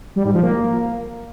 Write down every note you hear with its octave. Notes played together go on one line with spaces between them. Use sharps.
G3
G#2
F3
A#3